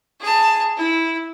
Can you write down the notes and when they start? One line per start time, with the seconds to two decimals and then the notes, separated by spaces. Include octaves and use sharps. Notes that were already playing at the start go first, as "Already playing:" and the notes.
0.20 G#4 A5
0.77 E4